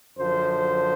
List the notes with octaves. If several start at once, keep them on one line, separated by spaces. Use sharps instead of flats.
F#2 D3 F3 C5